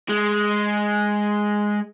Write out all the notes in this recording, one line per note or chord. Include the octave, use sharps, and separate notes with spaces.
G#3